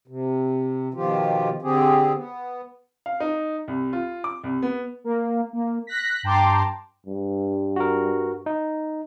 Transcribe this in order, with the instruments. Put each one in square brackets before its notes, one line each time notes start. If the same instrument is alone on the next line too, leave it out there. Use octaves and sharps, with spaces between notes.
[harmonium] C3
B2 D#3 F3 F4 G4
D3 C4 G4 G#4
B3
[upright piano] F5
D#4
C2
F4
D6
C2
B3
[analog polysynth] A#3
A#3
F#6 A#6 B6
G2 G5 A5 A#5 C6 D6
[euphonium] G2
[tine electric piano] F#4 A#4
D#4